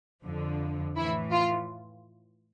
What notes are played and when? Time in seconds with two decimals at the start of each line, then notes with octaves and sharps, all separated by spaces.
0.25 F2 D3 F3
0.96 A2 E3 E4
1.32 F4